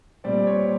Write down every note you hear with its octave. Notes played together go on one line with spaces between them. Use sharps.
A#2 G3 C4 D5
C#5